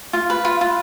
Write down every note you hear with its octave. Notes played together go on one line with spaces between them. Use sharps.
F4
B4
F4
F4